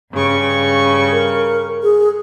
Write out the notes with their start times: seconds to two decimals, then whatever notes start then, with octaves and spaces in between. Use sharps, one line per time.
0.12 G2 C#3 C#6
1.12 A#4
1.83 G#4